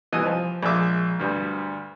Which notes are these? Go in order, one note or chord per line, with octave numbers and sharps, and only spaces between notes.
C2 E3 D#5 G#5
F3
A#1 G#3 E5 D6
D2 G2